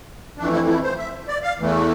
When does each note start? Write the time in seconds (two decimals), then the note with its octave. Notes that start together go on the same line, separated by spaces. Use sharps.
0.38 F2 E3 A3 D4
0.53 E4
0.67 E4
0.83 C5
0.98 E5
1.28 D5
1.43 F5
1.59 E2 E3 A3